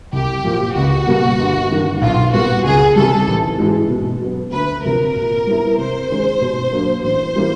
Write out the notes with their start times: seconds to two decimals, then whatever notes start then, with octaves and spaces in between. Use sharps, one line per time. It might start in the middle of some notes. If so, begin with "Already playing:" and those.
0.13 C2 G4
0.44 A#2 F3
0.76 C#2 F#4
1.07 B2 G3 A#3
1.38 G1
1.70 G2 D#3
2.01 B1 F4
2.33 A#2 G3 B3 F#4
2.64 C#2 G#4
2.95 C3 D#3 G3 A4
3.27 A1
3.58 G#2 E3 G#3
3.90 B2
4.21 F#3 B3
4.52 D2 B4
4.83 C3 F3 A#4
5.15 A#2
5.47 G3 B3 E4
5.78 C3 C5
6.10 D#3 G#3 C#4
6.41 B2
6.72 F#3 A#3 D4
7.03 A1 C5
7.36 E3 G3 A#3